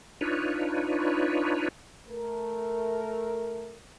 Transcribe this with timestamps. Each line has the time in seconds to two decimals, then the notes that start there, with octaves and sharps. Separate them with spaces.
0.21 D4 D#4 F4 B4 C#5
2.08 A3 A#4